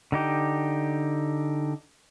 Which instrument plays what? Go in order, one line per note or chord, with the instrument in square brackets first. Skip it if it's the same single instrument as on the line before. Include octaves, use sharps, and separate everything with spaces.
[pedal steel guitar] D3 D#4 G4